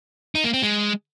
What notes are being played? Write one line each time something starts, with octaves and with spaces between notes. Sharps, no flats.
D#4
A#3
C4
G#3